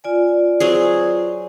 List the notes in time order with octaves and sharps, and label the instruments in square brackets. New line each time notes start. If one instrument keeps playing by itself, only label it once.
[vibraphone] F4 D5 G#5
[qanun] F#3 C4 G#4